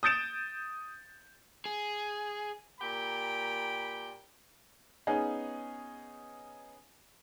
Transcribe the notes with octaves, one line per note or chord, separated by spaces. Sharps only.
D#6 G6 A6 D7 E7
G#4
A#2 A#3 G4 G5 A#5 B5
B3 C#4 D#4 G#4